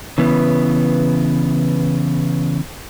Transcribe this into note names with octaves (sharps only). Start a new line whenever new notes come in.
C#3 E3 B3